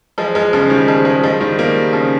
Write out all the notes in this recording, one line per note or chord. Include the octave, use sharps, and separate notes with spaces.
F3 G#3
F3 G#3
C#3 F3
D#3 G3
F3 G#3
F3 G#3
F3 G#3
D#3 G3
G3 A#3
C#3 F3